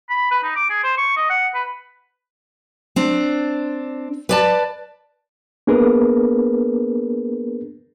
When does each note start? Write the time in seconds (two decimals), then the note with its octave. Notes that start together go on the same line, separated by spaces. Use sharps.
0.10 B5
0.31 B4
0.43 D#4
0.56 D6
0.70 G#4
0.84 C5
0.98 C#6
1.17 D#5
1.30 F#5
1.55 B4
2.96 C4 D4
4.29 B4 D5 A5
5.67 A#3 B3 D4 G#4 A#4 B4